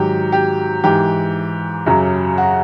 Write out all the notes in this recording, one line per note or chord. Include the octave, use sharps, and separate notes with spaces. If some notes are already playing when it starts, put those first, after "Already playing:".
Already playing: G#2 D#3 F#3 G4
G4
G#2 E3 G4
F#2 C#3 F#3
F#4